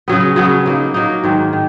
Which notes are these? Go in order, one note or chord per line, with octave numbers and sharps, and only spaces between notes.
C#3 F#3 B3
C#3 F#3 B3
F#3 A#3 D#4
F#3 A#3 D#4
G#2 D#3 F#3
D#3